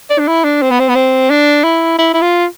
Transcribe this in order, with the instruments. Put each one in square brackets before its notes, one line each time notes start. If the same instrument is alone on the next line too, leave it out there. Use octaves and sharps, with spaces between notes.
[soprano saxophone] D5
D4
E4
D4
C4
B3
C4
B3
C4
D4
E4
E4
E4
F4